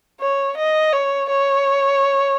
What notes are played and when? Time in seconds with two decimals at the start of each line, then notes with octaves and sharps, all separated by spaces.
0.21 C#5
0.57 D#5
0.93 C#5
1.30 C#5